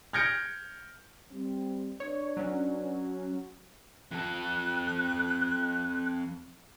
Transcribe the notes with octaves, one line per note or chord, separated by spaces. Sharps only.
F6 G6 G#6 A#6 C#7 D7
G3 C4
D4 B4 C#5 D5
F#3 C#4 F#4
F2 A4 F#6